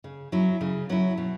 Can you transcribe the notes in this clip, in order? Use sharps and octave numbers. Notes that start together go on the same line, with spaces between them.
C#3
F#3 C#4 E4
C#3
F#3 C#4 E4
B2